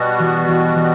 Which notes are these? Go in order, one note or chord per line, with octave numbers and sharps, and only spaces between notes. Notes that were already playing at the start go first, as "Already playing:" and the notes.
Already playing: B2 G3 B3 F#4
E3
E3
E3